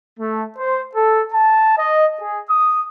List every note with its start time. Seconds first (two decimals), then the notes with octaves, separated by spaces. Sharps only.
0.18 A3
0.56 C5
0.94 A4
1.31 A5
1.76 D#5
2.19 G#4
2.49 D#6